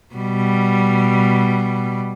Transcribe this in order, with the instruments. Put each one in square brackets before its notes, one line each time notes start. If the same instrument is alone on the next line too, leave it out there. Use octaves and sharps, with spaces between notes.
[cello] B2 G3